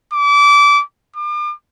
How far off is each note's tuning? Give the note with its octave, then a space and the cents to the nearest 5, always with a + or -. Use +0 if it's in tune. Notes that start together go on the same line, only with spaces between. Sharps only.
D6 -25
D6 +40